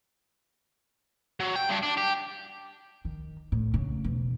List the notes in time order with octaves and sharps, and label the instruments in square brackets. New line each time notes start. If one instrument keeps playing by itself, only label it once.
[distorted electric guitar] F#3
G5
G2 D4
D4
G4
[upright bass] D#3
A2
C#3
E1